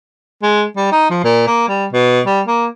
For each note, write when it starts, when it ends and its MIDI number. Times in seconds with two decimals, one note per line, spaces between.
0.43 0.64 56
0.76 0.90 55
0.92 1.08 63
1.10 1.24 53
1.24 1.43 46
1.47 1.68 58
1.69 1.86 55
1.93 2.21 47
2.26 2.41 55
2.47 2.66 58